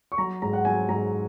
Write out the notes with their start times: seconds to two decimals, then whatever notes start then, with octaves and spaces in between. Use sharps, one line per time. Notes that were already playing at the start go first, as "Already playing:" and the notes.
0.12 C#6
0.18 F#3 A#5
0.42 G#2 A#5
0.53 F#5
0.65 F#3 G#5
0.89 G#2 A#5